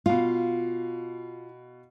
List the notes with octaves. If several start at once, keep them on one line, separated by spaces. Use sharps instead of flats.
B2 F4 F5